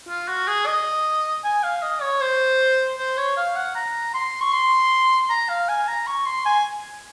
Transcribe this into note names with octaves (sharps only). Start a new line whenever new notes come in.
F4
F#4
G#4
D#5
G#5
F5
D#5
C#5
C5
C5
C#5
F5
F#5
A#5
C6
C#6
C6
A#5
F5
G#5
A#5
C#6
C6
G#5